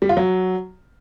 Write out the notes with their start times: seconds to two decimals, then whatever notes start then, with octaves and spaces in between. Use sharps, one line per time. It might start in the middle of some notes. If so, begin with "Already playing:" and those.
0.02 G3
0.09 F4
0.17 F#3